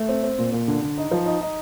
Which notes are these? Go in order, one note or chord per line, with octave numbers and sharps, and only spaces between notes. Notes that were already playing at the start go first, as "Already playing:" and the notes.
Already playing: A3
C4
C4
A#2
A#2
D3
D3
D#4
F3
D#4
D#4